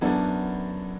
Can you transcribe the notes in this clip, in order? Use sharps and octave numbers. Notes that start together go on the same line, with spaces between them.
F#2 E3 B3 D4 A4